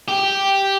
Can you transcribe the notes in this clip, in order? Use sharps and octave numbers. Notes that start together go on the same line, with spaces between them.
G4